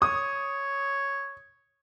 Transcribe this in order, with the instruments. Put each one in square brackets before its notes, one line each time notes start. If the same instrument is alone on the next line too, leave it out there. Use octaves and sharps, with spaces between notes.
[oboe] C#5 [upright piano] D#6